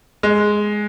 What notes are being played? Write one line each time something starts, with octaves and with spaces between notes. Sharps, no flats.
G#3